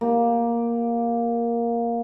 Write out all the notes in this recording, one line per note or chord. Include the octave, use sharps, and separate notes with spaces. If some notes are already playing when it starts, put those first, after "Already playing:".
A#3 G4